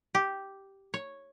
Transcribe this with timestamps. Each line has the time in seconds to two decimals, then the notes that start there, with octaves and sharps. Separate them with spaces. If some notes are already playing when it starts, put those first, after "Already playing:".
0.15 G4
0.94 C#5